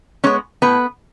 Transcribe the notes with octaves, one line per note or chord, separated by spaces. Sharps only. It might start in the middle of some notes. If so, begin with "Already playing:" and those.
G#3 B3 C#4 C#5
A2 B3 B4